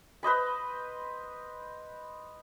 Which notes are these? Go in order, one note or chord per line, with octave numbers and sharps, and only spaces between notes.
B4 C5 D#5 B5